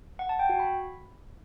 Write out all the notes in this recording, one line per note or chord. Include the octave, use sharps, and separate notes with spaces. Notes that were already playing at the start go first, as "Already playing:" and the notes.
F#5
A5
G5
F#4
B5